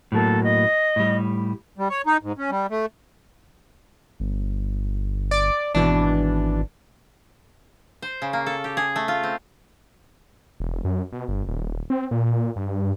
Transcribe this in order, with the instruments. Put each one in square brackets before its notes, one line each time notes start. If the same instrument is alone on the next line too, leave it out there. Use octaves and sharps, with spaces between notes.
[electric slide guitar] A2 F#3 A#3 [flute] A4
[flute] D#5
[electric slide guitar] A2 G3
[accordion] G3
C#5
D#4
G#2
C#4
G3
A3
[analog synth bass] G1
[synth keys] D5 D6
[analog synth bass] G#1 [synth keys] B2 E3 D4
[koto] C5
C#3
A#3
A4
G4
G#4
A3
F4
C4
[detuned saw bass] E1
F#2
B2
G1
D#1
C4
A#2
G2